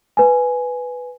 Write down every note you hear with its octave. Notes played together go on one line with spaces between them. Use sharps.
B4 G#5